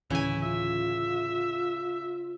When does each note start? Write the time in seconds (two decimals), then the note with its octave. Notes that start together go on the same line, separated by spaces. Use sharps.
0.10 D1 C#3 E3 E4 G#5
0.42 F4 E5